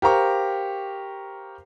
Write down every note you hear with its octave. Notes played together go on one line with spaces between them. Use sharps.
G4 A#4 C5 F5 A#5 C#6